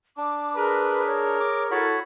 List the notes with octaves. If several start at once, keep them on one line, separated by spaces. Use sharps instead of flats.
D4 D6
G#4 A#4 B4
C#5
D6
E4 F#4 A4 C#5 B5